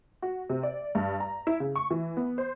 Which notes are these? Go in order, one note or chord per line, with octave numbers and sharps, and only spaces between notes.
F#4
C3
D5
G2
A#5
E4
C#3
C#6
E3
B3
C5